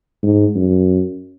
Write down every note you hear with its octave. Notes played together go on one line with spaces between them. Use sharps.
G#2
F#2